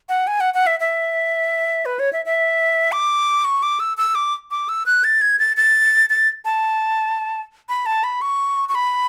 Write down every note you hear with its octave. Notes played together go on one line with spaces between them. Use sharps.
F#5
G#5
F#5
F#5
E5
E5
B4
C#5
E5
E5
D6
C#6
D6
E6
E6
D6
D6
E6
F#6
A6
G#6
A6
A6
A6
A5
B5
A5
B5
C#6
C#6
B5